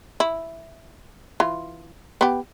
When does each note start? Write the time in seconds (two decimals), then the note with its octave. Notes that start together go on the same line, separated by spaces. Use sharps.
0.20 E4
1.40 E3 F4
2.21 B3 G4